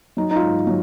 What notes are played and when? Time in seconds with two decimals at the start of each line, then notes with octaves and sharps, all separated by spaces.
0.17 F#3 D#4
0.31 D#4
0.36 F4
0.42 G#2
0.67 F#3